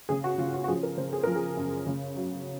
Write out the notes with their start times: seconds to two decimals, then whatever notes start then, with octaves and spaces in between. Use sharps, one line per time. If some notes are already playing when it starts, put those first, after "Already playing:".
0.09 C#3 G#4
0.24 F#4
0.38 C#3 F4
0.54 F#4
0.64 F#4
0.68 F3 G#4
0.83 A#4
0.97 C#3 C5
1.13 G#4
1.24 F3 A#4
1.35 G#4
1.57 F#2
1.87 C#3
2.16 F#3